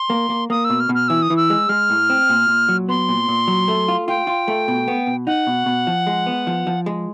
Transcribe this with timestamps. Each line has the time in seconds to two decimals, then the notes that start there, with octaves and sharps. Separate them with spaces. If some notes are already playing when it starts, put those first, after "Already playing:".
Already playing: C6
0.10 A#3
0.30 A#3
0.50 A#3 D#6
0.65 E6
0.70 B2
0.80 F6
0.89 B2
0.95 F6
1.08 E3 E6
1.22 D#6
1.30 E3
1.37 E6
1.50 G#3
1.69 G#3 F6
1.90 A2
2.10 C4
2.30 A#2
2.48 A#2
2.69 F#3
2.89 B3 C6
3.09 A#2
3.28 A#2
3.48 F#3
3.68 A3
3.88 F4
4.08 F4 G5
4.27 F4
4.48 A3
4.68 B2
4.88 B3
5.07 B2
5.27 D#4 F#5
5.47 B2
5.66 B2
5.87 F3
6.07 G#3
6.26 B3
6.47 F3
6.67 F3
6.86 G#3